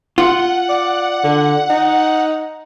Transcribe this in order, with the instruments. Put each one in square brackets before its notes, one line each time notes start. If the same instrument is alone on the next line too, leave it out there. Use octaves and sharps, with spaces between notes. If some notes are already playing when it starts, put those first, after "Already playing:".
[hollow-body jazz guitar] F4 [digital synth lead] F#5
[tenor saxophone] D5
D3
D#4